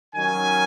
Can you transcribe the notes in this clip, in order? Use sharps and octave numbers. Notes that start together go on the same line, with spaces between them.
D#3 F#3 C#4 G#5